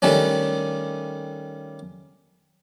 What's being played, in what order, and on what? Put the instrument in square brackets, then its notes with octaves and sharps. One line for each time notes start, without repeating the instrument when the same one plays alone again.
[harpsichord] D#3 G3 A3 C#4 D4